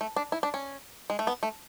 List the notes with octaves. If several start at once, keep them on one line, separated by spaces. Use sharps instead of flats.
A3
D4
E4
D4
C#4
G#3
A3
B3
A3